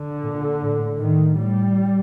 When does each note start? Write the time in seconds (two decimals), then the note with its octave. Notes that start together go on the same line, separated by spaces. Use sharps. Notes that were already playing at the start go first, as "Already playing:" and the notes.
Already playing: D3
0.23 A#2
0.61 A2
0.99 A2 D#3
1.37 A2 G3